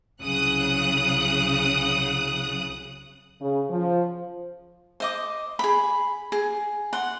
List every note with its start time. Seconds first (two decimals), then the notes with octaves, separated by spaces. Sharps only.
0.21 C2 C#3 F#3 D#6 F#6
3.40 C#3
3.70 F3
5.00 C5 D#5 D6
5.59 G#4 B5
6.32 G#4
6.93 F#5 C6